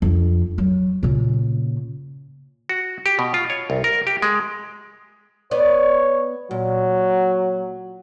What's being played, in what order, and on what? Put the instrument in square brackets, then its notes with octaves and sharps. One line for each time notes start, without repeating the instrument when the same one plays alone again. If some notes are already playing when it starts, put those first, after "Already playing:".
[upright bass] F2 D4
F#3
A#2 C#3
[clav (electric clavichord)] F#4
G4
B2
F4
C#5
C2
A#4
G4
G#3
[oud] B3 D5 [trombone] C#5
[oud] A#2 [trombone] F#3